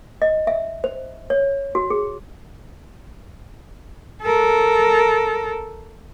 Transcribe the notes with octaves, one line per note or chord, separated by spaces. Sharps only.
D#5
E5
C5
C#5
F#4
G#4
A4 A#4